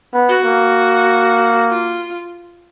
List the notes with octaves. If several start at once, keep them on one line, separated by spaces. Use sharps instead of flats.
B3
F#4
A#3
F4